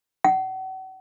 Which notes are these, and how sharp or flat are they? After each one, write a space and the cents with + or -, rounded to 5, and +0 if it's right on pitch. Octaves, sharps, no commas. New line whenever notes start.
F#5 +40